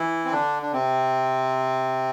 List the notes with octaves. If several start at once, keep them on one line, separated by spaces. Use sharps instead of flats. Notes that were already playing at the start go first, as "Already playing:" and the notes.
Already playing: E3 E4
C4
D3 D4
D4
C3 C4